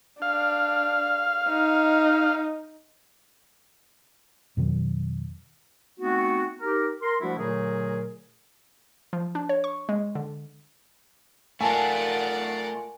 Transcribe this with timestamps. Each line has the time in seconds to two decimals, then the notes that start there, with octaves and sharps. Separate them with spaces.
0.22 D4 F5
1.49 D#4
4.57 F2 B2 D#3 F#3
5.98 A3 B3 C4 D#4 F#4
6.59 D#4 G4 A#4
7.02 A#4 C6
7.20 F3 G3 A3 D4 E4 F#4
7.36 A#2 D3 F#3 A3 G#4 A#4
9.13 F3
9.35 D4
9.49 C#5
9.64 C#6
9.89 G#3
10.15 D3
11.61 A3 F4 A#4 D5 F#5 G#5 A5